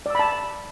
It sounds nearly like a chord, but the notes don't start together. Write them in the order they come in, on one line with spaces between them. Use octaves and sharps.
D5 E6 B5 A5